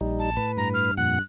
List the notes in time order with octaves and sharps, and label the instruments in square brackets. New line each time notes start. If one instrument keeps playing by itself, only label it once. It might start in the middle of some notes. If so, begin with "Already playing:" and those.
[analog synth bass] A#1 [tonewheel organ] G3 D#4
[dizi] A5
[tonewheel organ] A2 B4
[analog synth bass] G2 [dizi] A#5
[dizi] F6
[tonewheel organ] F2 A#2 F#5 [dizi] F#6